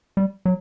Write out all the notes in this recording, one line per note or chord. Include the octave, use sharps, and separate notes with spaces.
G3
F#3